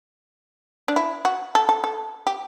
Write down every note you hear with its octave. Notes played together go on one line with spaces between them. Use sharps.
D4
E4
F#4
A4
A4
A4
G4